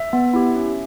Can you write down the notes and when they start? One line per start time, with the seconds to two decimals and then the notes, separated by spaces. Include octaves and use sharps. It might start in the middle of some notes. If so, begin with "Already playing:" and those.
Already playing: E5
0.13 B3
0.33 E4 G4
0.56 C#4